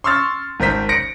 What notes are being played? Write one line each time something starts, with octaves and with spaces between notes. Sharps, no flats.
C6 C#6 E6 F6 A6
G#1 A#4 C5 B6
A#6 C#7 D7